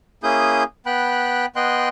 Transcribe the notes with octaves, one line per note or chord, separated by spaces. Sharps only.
A#3 C#4 E4 G#4 D#6 G6
B3 G5 B5 F#6
B3 D#5 G5 C6 F#6